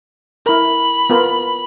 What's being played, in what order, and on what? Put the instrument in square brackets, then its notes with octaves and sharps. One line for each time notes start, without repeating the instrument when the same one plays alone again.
[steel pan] E4 A#4 [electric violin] B5
[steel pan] B3 F4 A#4